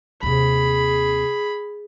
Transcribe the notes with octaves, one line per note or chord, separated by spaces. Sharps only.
D#2 C3 G#4 B5